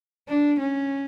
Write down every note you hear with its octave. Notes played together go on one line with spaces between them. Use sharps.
D4
C#4